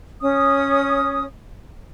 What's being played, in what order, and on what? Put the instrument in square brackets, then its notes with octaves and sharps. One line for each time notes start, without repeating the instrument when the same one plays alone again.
[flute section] C#4 D#6